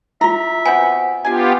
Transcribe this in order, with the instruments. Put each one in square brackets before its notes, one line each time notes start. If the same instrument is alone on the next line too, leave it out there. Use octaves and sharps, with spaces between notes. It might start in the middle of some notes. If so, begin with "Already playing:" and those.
[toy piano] E4 F4 [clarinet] E5 [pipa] A#5
[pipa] B3 C4 F#4 [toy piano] G#5
[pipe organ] B3 F4 G4 [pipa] D4 G#5